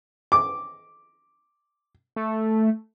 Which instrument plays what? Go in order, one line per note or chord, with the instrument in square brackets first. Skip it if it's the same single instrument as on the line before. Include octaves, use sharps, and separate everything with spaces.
[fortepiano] D6
[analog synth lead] A3